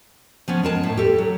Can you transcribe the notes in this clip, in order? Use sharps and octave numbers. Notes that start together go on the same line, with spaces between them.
F3 B3 C#4
G#3 A#4 A5
A2
G4 A4
F#3